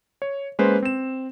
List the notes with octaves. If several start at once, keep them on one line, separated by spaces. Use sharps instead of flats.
C#5
G#3 A#3 C#4 B4 C5
C4 E7